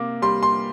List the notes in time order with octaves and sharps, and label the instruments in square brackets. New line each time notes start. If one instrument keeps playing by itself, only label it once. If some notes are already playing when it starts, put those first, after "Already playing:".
Already playing: [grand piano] C3 A#3 D6
G3 C6
C6